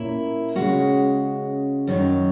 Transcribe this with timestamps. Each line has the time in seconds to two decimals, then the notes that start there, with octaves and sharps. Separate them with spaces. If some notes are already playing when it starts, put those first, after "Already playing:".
Already playing: A#2 A#3 C#4 E4
0.55 C#3 G#3 C#4 F#4
1.87 F#2 D#3 F#3